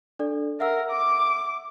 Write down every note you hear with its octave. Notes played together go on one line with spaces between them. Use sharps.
D4 A4 D5
A#4 E5 F#5 E6
D6